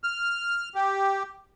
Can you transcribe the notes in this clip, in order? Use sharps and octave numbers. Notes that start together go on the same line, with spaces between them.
F6
G4